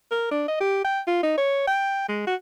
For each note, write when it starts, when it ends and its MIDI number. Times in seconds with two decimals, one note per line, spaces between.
0.11 0.28 70
0.31 0.43 62
0.48 0.60 75
0.61 0.81 67
0.84 1.01 79
1.07 1.20 65
1.23 1.34 63
1.38 1.62 73
1.67 2.07 79
2.09 2.23 56
2.27 2.35 66